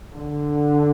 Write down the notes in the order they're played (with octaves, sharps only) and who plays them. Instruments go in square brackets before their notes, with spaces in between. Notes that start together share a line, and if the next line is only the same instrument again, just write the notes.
[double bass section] D3